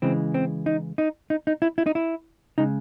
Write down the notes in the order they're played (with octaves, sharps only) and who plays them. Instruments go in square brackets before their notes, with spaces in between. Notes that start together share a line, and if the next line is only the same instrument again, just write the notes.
[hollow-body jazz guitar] C#3 E3 G#3 C4
C4
D#4
D#4
D#4
D#4
E4
E4
D#4
E4
C#3 G#3 D#4